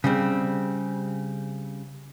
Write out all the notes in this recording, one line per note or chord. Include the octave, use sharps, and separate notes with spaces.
C#3 G3 C4